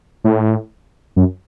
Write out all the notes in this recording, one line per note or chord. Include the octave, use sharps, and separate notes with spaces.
A2
F#2